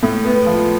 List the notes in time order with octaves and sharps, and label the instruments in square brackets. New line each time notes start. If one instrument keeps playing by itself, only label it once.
[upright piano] A2
B3
F3